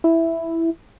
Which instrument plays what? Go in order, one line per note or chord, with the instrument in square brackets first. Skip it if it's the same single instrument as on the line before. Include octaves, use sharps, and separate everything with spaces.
[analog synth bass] E4